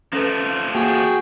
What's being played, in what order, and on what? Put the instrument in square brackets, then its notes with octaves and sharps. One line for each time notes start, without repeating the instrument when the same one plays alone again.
[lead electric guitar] F3 A3 [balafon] C#4 A4 B4
[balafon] A#3 [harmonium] F#4 G#4 G5